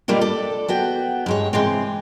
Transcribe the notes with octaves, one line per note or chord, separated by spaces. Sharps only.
B2 G3 A#3 D4 F4
A4 D5
B3 F#4 G5
G2 G#3 C#5
C3 E3 G#3 C4